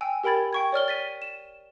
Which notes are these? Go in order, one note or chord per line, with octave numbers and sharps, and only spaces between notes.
G5 G#5 E6
G4 A#4 G5 B5 G#6 A6
G5 C#6 G#6
C#5 D5 F6 G7
A6 B6 D#7
E7